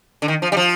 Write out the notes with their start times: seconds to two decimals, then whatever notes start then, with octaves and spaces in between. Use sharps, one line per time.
0.22 D3
0.28 D#3
0.42 F3
0.52 G3
0.57 F3